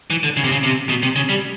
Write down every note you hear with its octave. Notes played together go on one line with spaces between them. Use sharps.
E3
D3
C#3
C3
C#3
C3
B2
C3
C#3
G3